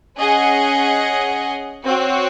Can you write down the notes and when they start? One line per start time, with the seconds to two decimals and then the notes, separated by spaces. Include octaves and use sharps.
0.17 C#4 G#4 D#5 F#5
1.84 C4 F#4 C#5